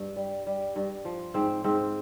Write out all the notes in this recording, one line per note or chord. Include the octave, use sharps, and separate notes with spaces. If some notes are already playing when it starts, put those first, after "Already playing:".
Already playing: G2
G3
G3
G2
F3
G#2 C4
G#2 C4